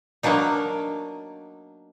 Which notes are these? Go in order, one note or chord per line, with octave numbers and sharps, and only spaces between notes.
F#3 A#3 B3 D4 D#4